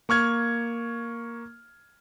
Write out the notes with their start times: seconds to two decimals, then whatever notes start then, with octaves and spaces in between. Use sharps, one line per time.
0.09 A#3 C#6 F6 G#6